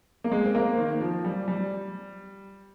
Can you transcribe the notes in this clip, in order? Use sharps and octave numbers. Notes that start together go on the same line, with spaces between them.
A#3
G#3
C4
A#3
D#3
F3
G3
G3